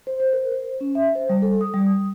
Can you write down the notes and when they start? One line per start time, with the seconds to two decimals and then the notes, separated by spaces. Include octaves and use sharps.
0.07 C5
0.20 C5
0.33 A#4
0.51 C5
0.81 C#4
0.95 E5
1.15 C5
1.29 G3
1.42 A4
1.61 D#6
1.74 G3
1.86 D#6